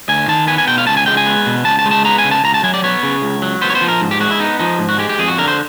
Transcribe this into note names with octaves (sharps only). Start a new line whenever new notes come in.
D2 G#5
D#3 A5
B3 G#5
G#5
B2 G5
F5
C#2 A5
G#5
G#3 G5
G#5
B3
B2
C#2 A5
A5
G#3
A5
B3 A#5
G#5
C#3
A5
C#2 A#5
A5
F#3 G#5
D5
B3 C#5
C#3
C#2
F#3
B3 C5
C#5
C5
F3
A#4
G#2
G4
G#3 F#4
E4
B3 D#4
F3 D#4
G#2
F#4
G#3 G4
G4
F2 G#4
F#4
D3 A#4
C5